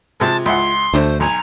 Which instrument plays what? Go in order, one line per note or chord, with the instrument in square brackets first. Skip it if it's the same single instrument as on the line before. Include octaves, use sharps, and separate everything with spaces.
[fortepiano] C3 G#3 [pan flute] F4 [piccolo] A5
[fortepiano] C#2 E4 F#5 [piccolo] C6
[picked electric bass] D2 [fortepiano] D3 A3 [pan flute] C5
[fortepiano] B1 [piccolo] G#5 [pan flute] A#5